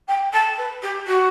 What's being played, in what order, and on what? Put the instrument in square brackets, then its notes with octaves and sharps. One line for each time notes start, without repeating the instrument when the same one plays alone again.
[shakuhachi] G5
A5
B4
G4
F#4